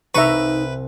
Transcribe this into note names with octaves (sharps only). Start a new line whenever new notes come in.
C2 D#4 B4 E5 F5 A#5 C#6